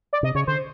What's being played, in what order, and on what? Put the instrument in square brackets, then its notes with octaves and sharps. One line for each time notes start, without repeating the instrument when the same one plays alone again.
[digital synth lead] D5
[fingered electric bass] C3 [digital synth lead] D#5
[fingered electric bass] C#3 [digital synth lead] C#5
[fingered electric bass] D3 [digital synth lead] C5